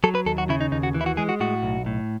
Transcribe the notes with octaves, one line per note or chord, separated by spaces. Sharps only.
F#3 A4
B4
D#2 A4
F#4
C#3 E4
D#4
D#2 D#4
F#4
E3
E4
F#4
G#3 G#4
F#4
A2 F#4
B1
A2